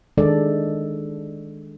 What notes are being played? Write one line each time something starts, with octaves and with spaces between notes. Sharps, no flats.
D#3 G#3 D4 A4 D5